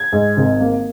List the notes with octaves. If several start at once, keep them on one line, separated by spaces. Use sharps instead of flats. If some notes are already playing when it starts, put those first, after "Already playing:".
Already playing: G#6
G#2
G#1
A#3